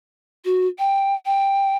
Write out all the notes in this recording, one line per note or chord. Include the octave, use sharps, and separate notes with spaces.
F#4
G5
G5